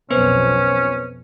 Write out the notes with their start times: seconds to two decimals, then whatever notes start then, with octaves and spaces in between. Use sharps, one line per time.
0.10 B1 F2 B3 C#4 B4 C5